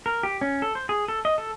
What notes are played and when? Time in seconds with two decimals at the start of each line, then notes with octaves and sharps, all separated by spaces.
0.06 A#4
0.23 G4
0.41 C#4
0.62 A4
0.75 C5
0.89 G#4
1.08 A4
1.25 D#5
1.38 A4